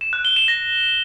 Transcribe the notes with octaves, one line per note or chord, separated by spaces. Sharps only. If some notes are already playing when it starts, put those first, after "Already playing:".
E7
F#6
G7
E7
A#6